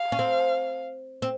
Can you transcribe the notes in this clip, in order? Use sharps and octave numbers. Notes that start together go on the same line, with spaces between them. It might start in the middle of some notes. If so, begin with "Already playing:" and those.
Already playing: F5
C#4
C4
C4